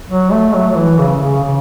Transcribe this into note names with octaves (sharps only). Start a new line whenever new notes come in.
F#3
A3
F#3
F#3
E3
C#3
C#3
C#3